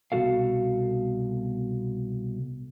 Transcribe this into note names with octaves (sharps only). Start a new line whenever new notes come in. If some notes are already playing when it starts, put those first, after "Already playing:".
C2 B2 E3 F#4 A4 F5